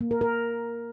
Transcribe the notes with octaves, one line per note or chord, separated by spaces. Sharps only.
A#3
A#4
A#4